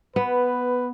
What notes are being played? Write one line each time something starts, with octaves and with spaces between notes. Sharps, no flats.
B3 B4